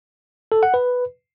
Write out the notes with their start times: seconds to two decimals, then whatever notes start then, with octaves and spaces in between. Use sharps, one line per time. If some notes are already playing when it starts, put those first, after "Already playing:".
0.52 A4
0.63 F#5
0.74 B4